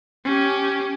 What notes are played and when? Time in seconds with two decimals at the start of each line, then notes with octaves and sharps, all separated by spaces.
0.25 C#4 G4